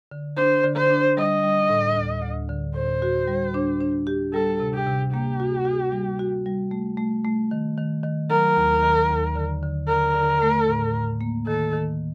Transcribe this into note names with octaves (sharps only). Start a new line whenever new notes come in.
D3
D4 C5
D3
C5
D4
G3 D#5
G3
A2
D2
D2
D3
A2 C5
F#4
G3
D4
D4
G4
G3 A4
C3
G4
C3
A#3 G4
F#4
F#4
G3
F#4
G3
A3
A3
A3
D#3
D#3
D#3
F#3 A#4
D#2
D#3
D#2
D3
D3
D3 A#4
D3
A3
A2
A2
A#3
D#3 A4
D#3